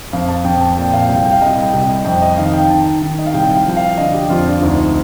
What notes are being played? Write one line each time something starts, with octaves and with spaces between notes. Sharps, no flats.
F2 F5
A5
F2 G5
A5
A#2 G5
F5
C2 G5
G5
F5
C2 D#5
G5
C2
D#5
F2 G5
D#5
D#3 F5
G5
D#3 A5
D#3
D#5
F5
C2 G5
F5
F3 G5
F5
D3 D#5
G4
F2 F4
D4
F4
D2 D#4